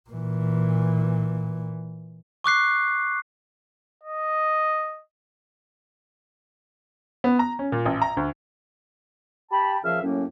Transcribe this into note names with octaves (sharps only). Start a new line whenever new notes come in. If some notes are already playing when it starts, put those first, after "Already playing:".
A#2 E3
C#6 D6 F#6 C7
D#5
B3
A#5
C#4
A#2
A1
A#5
D2
G4 G5 A5 B5
A#2 C#3 F3 E5 F5 F6
F#2 A2 F#3 A#3 C#4